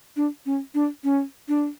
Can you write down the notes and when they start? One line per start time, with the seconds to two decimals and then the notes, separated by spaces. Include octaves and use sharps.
0.16 D4
0.46 C#4
0.75 D4
1.04 C#4
1.48 D4